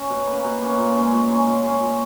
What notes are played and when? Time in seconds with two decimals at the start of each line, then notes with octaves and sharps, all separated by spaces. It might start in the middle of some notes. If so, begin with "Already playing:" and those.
Already playing: C#4
0.10 B2
0.27 A#3
0.32 C#4
0.44 B2
0.62 A#3 C#4
0.78 A#2
0.96 G#3 C#4
1.12 A#2
1.29 G#3 C#4
1.45 A#2
1.63 G#3 C#4
1.80 A#2